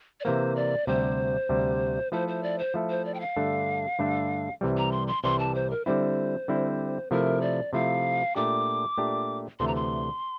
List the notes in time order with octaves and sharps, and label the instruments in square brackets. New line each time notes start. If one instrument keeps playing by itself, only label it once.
[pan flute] D5
[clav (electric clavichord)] C3 E3 A#3 [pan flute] C5
[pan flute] D5
[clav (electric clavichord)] D2 C3 G3 [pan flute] C5
[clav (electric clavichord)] D2 C3 G3
[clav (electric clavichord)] F3 A3 E4 A4 [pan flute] C5
[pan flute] C5
D5
C5
[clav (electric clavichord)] F3 A3 E4 A4
[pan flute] C5
D5
G5
F5
[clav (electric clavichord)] G2 D3 A3 D4 A4
G2 D3 A3 D4 A4
C2 C3 E3 G3
[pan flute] A#5
C6
C6
[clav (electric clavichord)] C2 C3 E3 G3 [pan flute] C6
[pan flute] A5
C5
A#4
[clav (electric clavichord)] D3 G3 C4 E4 [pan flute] C5
[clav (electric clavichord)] D3 G3 C4 E4
[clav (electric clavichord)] C3 F3 A3 E4 [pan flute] A#4
[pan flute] D5
[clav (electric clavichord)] C3 F3 A3 E4 [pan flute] F5
[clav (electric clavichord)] A#2 A3 D4 G4 [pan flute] D6
[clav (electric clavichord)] A#2 A3 D4 G4
[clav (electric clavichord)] D2 C3 E3 A3 [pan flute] C6
[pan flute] A#5
C6